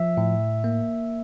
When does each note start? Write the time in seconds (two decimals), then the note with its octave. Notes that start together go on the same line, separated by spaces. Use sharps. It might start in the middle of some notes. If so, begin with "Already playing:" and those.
Already playing: F3 E5
0.17 A2
0.64 A#3